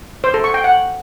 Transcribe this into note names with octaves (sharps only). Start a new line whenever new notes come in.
C5
A4
C#6
G5
F#5